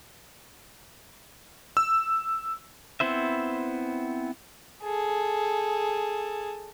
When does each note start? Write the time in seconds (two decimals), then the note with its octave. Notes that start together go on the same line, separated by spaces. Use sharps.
1.77 E6
3.00 B3 C4 E4 C5 E5
4.84 G#4 A4